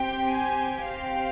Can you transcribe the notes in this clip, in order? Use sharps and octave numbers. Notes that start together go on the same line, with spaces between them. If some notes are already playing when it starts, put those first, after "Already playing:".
Already playing: C4 G4 G5
G#5
C4 G4 F5